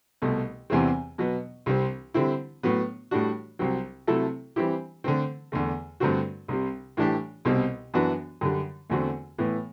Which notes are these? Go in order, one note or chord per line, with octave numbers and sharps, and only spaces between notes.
C2 B2 A3
E2 C3 E3 G3 C4
B2 F#3 B3
C2 C3 G3 C4
D3 G3 C4 E4
A2 F#3 B3
A2 G3 D4 F#4
C2 C3 F#3 C4
C3 F#3 A3 E4 A4
E3 G3 C4 E4 G4
D3 A3 C4
E2 D3 A3
G2 D3 A3 C4 F#4
C2 C3 G3
A2 E3 G3 D4 G4
C2 B2 G3 C4
F#2 E3 B3 D4 F#4
F#2 D3 G3
E2 D3 A3 C4 F#4
A2 E3 B3